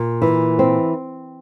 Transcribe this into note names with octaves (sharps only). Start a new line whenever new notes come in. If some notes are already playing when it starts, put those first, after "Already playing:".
Already playing: A#2
E3
C4